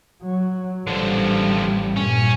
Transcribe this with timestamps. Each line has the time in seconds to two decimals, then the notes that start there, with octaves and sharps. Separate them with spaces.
0.23 F#3
0.87 A1 D3 F3 G3
1.97 G2 A#2 C#4